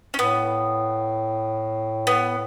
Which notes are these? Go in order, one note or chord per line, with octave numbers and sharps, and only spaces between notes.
C#4
A2 B3
B3